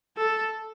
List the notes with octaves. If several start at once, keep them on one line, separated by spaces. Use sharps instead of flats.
A4